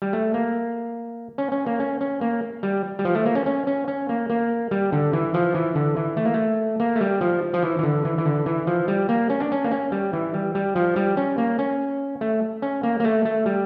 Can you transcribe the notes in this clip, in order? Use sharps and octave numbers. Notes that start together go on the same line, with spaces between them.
G3
A3
A#3
C#4
C#4
A#3
C#4
C#4
A#3
G3
G3
F3
A3
A#3
C#4
C#4
C#4
C#4
A#3
A#3
G3
D3
E3
F3
E3
D3
E3
A3
A#3
A3
A#3
A3
G3
F3
F3
E3
E3
D3
E3
E3
D3
E3
F3
G3
A#3
C#4
D4
C#4
A#3
C#4
G3
E3
G3
G3
F3
G3
C#4
A#3
C#4
A3
C#4
A#3
A#3
A3
A3
G3